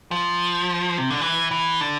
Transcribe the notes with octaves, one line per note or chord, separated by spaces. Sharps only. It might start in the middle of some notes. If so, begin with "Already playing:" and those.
F3
C3
D3
E3
E3
D3